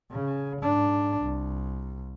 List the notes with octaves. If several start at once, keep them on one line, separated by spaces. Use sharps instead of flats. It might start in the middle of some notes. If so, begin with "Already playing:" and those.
C#3
G#2 D4
C2